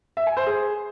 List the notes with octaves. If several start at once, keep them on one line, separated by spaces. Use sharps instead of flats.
E5
G#5
C5
G#4